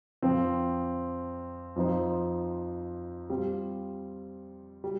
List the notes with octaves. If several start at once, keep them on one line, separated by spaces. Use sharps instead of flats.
F2 F3 C4
F2 F3 D#4 C5
G3 C4 F4
G3